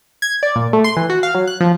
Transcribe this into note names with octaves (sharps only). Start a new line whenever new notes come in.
G#6
D5
A#2
A3
C6
E3
F#4
F5
F#3
F#6
F3